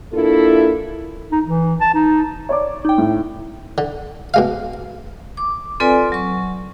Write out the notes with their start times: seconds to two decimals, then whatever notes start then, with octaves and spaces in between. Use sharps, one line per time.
0.13 A#3 D4 E4 F4 A4
1.32 D#4
1.45 E3
1.81 A5
1.94 D#4
2.49 C#5 D5 D6
2.85 D#4 G5
2.98 A2
3.78 D3
4.34 B2 G#3 F5
5.37 D6
5.80 C4 F4 A4 B4 D5 G#5
6.12 F#3 C#6